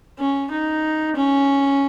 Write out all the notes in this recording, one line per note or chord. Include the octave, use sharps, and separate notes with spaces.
C#4
D#4
C#4